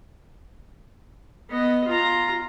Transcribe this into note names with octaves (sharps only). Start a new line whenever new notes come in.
B3 D#5
F4 A#5